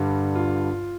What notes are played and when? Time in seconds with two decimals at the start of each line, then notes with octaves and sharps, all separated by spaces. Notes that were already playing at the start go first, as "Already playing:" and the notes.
Already playing: G2 D3 G3
0.35 F4